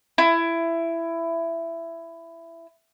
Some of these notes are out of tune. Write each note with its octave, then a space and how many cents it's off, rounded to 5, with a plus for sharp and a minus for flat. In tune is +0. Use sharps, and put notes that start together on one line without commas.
E4 +15